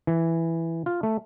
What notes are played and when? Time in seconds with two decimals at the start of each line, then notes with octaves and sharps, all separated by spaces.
0.07 E3
0.86 F4
1.03 A3